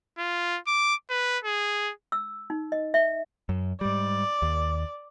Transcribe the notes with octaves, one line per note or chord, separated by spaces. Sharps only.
F4
D6
B4
G#4
E6
D#4
D#5
E5
F#2
G#2 G3 D5
D#2